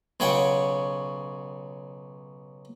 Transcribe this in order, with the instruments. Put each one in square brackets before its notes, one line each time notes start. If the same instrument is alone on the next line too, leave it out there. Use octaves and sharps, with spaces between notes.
[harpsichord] B1 C#3 C#5 F#5 G5